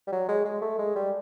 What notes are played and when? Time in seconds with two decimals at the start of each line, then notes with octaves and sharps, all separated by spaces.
0.07 G3
0.12 F#3
0.28 G#3
0.45 G#3
0.61 A3
0.78 G#3
0.95 G3